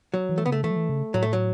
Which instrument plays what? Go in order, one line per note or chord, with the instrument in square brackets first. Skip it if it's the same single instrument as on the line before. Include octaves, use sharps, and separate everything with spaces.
[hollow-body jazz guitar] F#3
[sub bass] E3
[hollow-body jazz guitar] A3
[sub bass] C#3 [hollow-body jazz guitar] B3
[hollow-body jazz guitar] A3
[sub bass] E3 [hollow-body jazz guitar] A3
[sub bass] F#3
E3
C#3
[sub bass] A2 [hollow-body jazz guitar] F#3
[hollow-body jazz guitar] A3
F#3